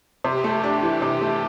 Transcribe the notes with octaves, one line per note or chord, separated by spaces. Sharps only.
C3 G4
A3
D4
E3
C3
A3